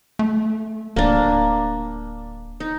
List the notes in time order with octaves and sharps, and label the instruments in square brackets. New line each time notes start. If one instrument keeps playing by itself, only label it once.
[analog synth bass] A3
[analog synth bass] D1 [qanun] A#3 D4
[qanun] D#4